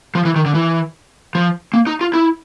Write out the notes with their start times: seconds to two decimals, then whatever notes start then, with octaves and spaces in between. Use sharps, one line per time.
0.15 F3
0.25 E3
0.36 D#3
0.46 D3
0.55 E3
1.35 F3
1.74 A#3
1.87 D#4
2.01 F4
2.14 E4